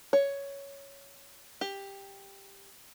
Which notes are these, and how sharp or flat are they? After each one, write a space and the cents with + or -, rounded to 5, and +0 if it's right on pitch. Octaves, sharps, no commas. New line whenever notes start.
C#5 +5
G4 +10